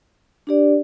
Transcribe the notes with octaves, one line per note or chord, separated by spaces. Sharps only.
D4 G4 D5